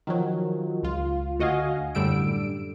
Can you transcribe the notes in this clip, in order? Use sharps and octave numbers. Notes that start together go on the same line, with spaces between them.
D#3 F3 F#3
C#2 F4
D2 F#4 D#5 F5 G#5
F#2 A2 D3 G3 E6 D7